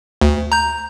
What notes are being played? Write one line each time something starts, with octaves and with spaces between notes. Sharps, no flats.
D2
A#5 G6